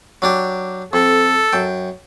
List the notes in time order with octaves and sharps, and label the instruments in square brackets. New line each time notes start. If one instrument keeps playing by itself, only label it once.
[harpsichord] F#3 D4 G4
[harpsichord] F2 [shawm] A4
[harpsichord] F#2 G5